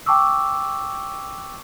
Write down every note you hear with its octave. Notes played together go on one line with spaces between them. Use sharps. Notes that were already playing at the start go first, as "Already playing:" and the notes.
G5 A5 C#6 D6 E6